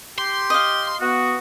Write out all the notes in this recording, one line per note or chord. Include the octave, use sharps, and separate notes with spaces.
G4 C6
D#5 F5
B3 F#4 D#6